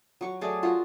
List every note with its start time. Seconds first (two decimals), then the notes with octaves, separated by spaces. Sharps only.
0.21 F#3 C#6
0.41 F#3 A3 G#4 D5
0.63 F4 F#4 A#4